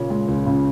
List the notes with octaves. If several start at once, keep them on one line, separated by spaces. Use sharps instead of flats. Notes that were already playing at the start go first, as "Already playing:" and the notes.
Already playing: A#2 C#3 C#4
G#3
C#2
C#3